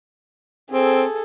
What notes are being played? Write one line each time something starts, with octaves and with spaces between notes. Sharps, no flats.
C4 G#4 A4